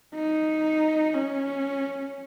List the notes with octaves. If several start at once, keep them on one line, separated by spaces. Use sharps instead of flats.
D#4
C#4